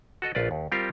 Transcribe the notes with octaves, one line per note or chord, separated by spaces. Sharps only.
F#4 A4 D#5
A#1 F4 B4 D5
D#2
G3 C4 F4 G4 A#4